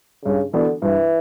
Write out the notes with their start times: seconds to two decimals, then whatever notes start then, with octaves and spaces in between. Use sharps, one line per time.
0.25 G2 C#3
0.53 D3 E3 B3 D4 F#4
0.82 G2 E3